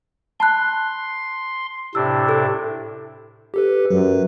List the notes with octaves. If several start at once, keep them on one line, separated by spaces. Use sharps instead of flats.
A5 B5 C6 F#6
A2 C3 D4 E6
A4
G4 A4 B4
F#2 F#3 B4